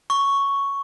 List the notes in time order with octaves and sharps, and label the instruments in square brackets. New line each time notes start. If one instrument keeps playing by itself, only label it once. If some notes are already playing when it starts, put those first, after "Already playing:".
[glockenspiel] C#6